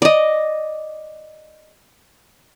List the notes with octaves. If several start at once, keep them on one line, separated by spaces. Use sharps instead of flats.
D5 D#5